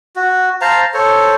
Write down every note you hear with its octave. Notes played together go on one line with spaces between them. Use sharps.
F#4
C5 F5 A5 A#5
A4 C5 C#5